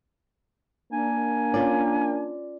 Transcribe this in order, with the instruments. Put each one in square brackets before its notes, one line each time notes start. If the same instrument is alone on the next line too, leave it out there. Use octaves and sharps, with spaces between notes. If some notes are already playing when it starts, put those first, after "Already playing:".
[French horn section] A#3 D4 [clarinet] G#5
[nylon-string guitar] C#4 F4 D5